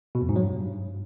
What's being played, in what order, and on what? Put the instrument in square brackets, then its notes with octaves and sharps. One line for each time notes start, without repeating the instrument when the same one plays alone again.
[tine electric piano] B2
F2
G#2
F#3
G2